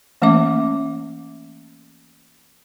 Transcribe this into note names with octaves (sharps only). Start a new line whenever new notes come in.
E3 A3 A#3 C#4 E5 D6